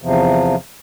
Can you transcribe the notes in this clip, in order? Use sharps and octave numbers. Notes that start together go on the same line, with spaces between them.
E2 C3 F3